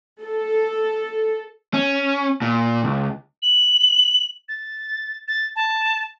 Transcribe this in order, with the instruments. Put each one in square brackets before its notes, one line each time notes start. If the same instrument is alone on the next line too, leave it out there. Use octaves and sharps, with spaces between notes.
[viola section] A4
[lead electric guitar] C#4
A#2
C#2
[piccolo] F#7
A6
A6
A5